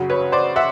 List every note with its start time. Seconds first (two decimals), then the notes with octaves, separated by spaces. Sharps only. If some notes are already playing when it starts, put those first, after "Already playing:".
Already playing: F#2 C#3 F#3
0.10 B4 C#5
0.32 C5 D5
0.56 E5 F#5